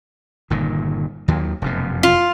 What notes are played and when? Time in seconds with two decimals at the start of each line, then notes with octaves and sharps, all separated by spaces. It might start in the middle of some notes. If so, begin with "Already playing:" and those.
0.50 G1 A#2 D#3
1.28 D#2 D#3 F#3
1.62 F1 F#2 B2
2.03 F4